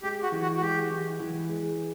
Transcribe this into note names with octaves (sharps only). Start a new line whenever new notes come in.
G#3 G4
F#4
E3
F#4
F#4
G#3 G4
E3
E3
G#3